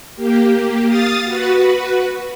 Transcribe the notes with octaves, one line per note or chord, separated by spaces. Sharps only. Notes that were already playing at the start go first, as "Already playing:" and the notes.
A#3 G4
F5 D#6 A6
F#4 B4